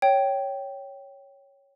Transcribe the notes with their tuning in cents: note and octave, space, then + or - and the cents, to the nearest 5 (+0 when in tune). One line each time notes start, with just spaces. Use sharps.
C#5 +0 G5 -10